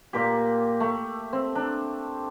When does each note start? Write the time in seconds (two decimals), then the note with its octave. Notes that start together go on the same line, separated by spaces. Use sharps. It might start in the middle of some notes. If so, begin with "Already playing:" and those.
0.13 A#2 G4
0.80 A3
1.33 C4
1.55 D4